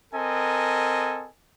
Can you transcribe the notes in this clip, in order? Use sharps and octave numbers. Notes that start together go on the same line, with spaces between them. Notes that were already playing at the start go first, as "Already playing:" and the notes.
C4 A4 A#4 D#5 G#5